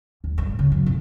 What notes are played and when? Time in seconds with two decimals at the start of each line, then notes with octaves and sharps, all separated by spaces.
0.24 D#2
0.38 G2
0.59 C#3
0.72 F#2
0.86 C2